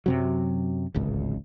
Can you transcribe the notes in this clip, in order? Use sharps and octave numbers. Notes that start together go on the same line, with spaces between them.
F#2 C3 F#3
D1 G#1 C#2